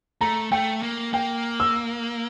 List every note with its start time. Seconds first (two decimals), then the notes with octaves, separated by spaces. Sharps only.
0.21 A3 A#5
0.51 A3 G5
0.83 A#3
1.13 A#3 G5
1.60 E6